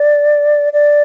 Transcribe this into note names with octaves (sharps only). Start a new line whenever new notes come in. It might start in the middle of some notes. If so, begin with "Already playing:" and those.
Already playing: D5
D5